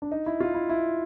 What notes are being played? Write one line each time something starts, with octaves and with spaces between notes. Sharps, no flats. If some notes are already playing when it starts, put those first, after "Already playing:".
D4
D#4
E4
F4
E4
E4